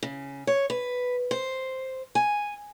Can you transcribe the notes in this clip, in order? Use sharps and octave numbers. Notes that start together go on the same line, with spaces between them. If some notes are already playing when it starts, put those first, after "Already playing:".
C#3
C#5
B4
C5
G#5